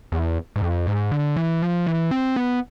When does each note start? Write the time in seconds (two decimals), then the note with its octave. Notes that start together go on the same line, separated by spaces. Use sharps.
0.12 E2
0.56 G#2
0.61 F2
0.87 G#2
1.12 D3
1.37 E3
1.62 F3
1.87 E3
2.11 C4
2.36 B3